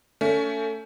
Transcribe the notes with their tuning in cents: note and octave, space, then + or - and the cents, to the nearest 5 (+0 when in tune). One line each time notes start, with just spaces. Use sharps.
A3 +25 C#4 +30